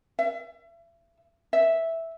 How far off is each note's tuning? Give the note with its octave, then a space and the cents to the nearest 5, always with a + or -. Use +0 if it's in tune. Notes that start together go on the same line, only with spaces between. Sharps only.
E5 +35
E5 -5